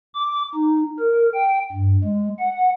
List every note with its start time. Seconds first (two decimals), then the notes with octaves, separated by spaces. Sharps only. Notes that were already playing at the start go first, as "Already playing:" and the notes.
0.14 D6
0.55 D#4
0.99 A#4
1.33 G5
1.72 G2
2.04 G#3
2.39 F#5